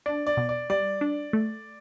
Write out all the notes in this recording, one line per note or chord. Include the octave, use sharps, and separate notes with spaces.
D4 D5
D5
B2
D5
G3 D5
D4
A3